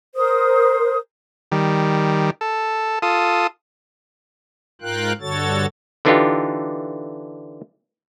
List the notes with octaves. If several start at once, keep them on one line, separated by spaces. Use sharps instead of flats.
A#4 C5 D#6
D#3 G3
A4
F4 A4 D#6
G#2 F4 A#4 F5 G5 F#6
G2 D3 F#4 A4 C#5 A6
D3 E3 D4 D#4 F4 G4